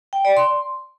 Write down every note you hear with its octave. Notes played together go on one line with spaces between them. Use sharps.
G5
D5
C6